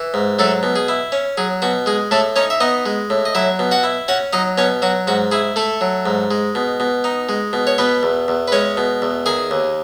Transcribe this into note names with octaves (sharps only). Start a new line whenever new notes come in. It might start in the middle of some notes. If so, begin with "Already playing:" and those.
Already playing: E3
G#2
F#3 A3 A4
B2
G#4
E4
C#4
F#3 G#4
B2 F#4
G#3 G#4
A2 A3 A4
C#4 D#4 C#5
E5
B3 D#4 D#5
G#3
A2
D#5
F#3 E4 E5
B2
F#4 F#5
E4
C#4 F#4 F#5
F#3 D#4 D#5
B2 C#4 C#5
F#3 F#4
G#2 F#4
E4 G#4
A3 A4
F#3
G#2
G#3
B2
B2
D#4
G#3
B2
C#5
B2 B3 B4
E2
E2
B4
G#3 C#4 C#5
B2
E2
D#3 G#4 G#5
D#2